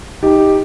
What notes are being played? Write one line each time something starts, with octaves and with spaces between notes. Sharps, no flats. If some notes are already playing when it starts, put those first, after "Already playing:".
D#4 G4